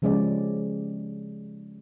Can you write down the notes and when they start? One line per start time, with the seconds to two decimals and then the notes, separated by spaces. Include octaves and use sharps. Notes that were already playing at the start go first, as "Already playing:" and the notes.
0.02 C#3 F3 G#3 C#4 G4 D5